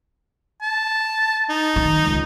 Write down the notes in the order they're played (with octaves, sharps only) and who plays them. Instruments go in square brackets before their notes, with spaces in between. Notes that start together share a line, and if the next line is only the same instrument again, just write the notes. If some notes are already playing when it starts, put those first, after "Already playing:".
[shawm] A5
D#4
[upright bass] D#3
C#2